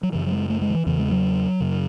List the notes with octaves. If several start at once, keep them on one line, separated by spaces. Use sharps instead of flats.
F#3
F#2 C#3 E3
F#3
G#3
A3
G#3
D#3
E3
E2 C#3 E3
G#3
F#3
F#2 C#3